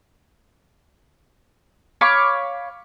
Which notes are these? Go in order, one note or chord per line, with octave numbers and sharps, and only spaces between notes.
C#5 F5 B5 D6